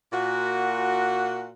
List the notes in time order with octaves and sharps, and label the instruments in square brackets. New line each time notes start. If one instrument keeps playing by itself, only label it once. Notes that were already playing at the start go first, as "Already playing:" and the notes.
[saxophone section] A#2 F#4